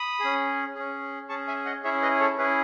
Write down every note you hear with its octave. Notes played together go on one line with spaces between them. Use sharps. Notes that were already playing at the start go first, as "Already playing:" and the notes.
Already playing: B5 D#6
C#4 G#4
C#4 G#4
C#4 G#4 A5 C#6
E5 G#5
D#5 F#5
C#4 E4 G#4 C#5 E5
B4 D#5
A4 C#5
C#4 E4 G#4 B4